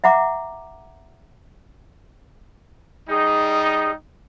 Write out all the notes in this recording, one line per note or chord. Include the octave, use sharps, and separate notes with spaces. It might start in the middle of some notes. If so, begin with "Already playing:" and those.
E5 F#5 A#5 D6
G3 D#4 G#4